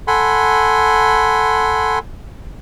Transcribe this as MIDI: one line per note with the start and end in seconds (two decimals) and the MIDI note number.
0.07 1.99 69
0.07 1.99 78
0.07 1.99 80
0.07 1.99 83
0.07 1.99 84